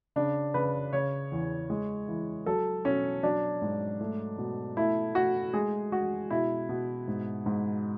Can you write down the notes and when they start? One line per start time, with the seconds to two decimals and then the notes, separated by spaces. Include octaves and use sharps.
0.16 C#3 D4
0.54 C#3 B4
0.93 C#3 C#5
1.32 E2
1.70 G#3
2.08 E3
2.46 F#3 A4
2.85 B2 C#4
3.23 F#3 D4
3.62 G#2
4.01 A3
4.38 B2
4.77 A3 E4
5.15 A3 F#4
5.54 G#3 G#4
5.92 G#3 F#4
6.30 B2 E4
6.69 B2
7.08 G#2
7.46 G#2